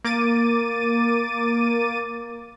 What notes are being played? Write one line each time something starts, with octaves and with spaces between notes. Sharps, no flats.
A#3 D6 A6 D#7